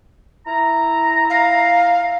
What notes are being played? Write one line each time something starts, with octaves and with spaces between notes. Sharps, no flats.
E4 A#5
F5